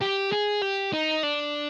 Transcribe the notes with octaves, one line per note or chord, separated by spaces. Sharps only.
G4
G#4
G4
D#4
D4